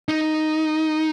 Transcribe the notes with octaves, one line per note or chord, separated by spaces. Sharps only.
D#4